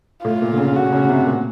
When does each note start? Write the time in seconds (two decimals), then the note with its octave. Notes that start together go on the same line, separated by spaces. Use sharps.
0.24 A2 F4
0.42 A#2
0.52 D3
0.58 C#3
0.75 D3 F#4
0.93 C#3
1.09 C3
1.27 A#2